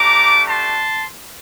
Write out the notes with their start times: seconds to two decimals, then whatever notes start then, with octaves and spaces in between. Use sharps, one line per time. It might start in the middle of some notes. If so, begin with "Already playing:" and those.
Already playing: A3 D4 G4 A#5 D6
0.48 A5 C6